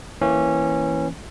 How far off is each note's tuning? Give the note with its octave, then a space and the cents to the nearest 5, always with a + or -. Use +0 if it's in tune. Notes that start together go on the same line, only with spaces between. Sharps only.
E3 +0 A#3 +0 C#4 -15